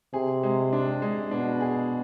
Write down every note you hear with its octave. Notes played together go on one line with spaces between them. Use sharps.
C3 G#4
G#3
D4
G#3
B2 D4
G#4